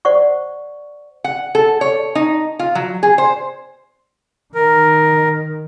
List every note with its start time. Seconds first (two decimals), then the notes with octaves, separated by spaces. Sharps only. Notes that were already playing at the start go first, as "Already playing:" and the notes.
0.05 C5 D5 F#5 C#6
1.24 F#5
1.55 A4
1.81 C#5
2.15 D#4
2.59 F4
2.75 F#3
3.03 G#4
3.18 C5
4.55 D#3 A#4